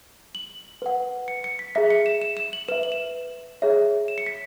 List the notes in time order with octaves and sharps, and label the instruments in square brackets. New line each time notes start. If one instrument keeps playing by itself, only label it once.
[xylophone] F#7
B4 F#5
C#7
C#7
B6
G#4 E5 B6
C#7
E7
E7
E7
F#7
B4 E5 E7
F#7
E7
G#4 C#5 E5
E7
C#7
B6